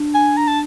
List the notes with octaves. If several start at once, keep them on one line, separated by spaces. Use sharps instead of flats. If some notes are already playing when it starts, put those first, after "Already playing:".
Already playing: D4
G#5
A#5
A5